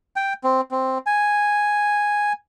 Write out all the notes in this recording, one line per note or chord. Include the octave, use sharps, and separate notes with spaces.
G5
C4
C4
G#5